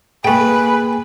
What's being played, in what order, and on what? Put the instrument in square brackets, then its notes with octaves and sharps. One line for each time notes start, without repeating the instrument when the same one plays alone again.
[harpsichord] A3 G5 [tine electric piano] A#3 G#4 [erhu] B4 [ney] G#5